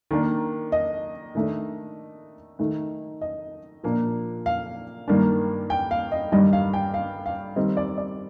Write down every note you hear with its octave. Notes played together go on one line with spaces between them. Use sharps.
D#3 A#3 D4
D#5
D#3 A3 D4
D#3 A3 D#4
D#5
A#2 F3 A#3 D4
F5
G2 D#3 A#3 D4
G5
F5
D#5
G2 D#3 G3 D4 D#5
F5
G5
F5
F5
D#3 G3 C4 D#5
D5
D5